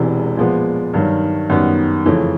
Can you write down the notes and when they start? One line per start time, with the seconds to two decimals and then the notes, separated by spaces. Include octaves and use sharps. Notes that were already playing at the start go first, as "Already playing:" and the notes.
Already playing: E1 E2 C3 E3 G#3
0.37 A#2 F3 G#3 B3
0.94 G2 D#3 F#3
1.50 F#2 D#3 G3 B3
2.06 F2 C#3 E3 A3 C#4